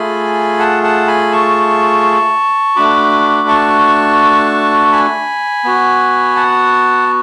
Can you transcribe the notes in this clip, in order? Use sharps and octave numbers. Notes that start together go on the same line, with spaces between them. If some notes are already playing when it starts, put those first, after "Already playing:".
Already playing: A3 F4 G#4 G#5 B5
F#5 A5
F#5 A5
G#5 B5
A5 C#6
A3 D4 F#4 B5 D6
A5 C#6
G#5 B5
B3 F#4
F#5 A5